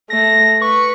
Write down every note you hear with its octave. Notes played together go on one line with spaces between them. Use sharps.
A3 A#6
B4 C#6